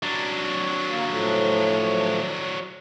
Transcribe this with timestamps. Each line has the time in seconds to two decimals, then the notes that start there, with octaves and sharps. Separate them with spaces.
0.03 F#3 D4
0.89 A#3
1.09 A2 F3 A3